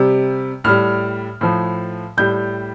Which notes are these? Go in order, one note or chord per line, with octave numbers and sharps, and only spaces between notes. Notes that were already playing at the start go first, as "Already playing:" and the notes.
Already playing: C3 G3
A2 G3 F6
A2 F3
A2 G3 G6